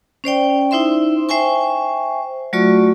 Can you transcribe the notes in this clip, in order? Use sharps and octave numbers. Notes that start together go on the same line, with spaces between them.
C#4 C5 D5 G5
D#4 E4 C5 E5 C6
C5 E5 G5 G#5 C#6
F#3 A3 F4 F#4 D5 C#6